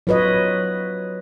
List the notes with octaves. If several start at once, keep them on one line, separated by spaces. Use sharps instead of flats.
F#3 F4 B4 C#5 D#5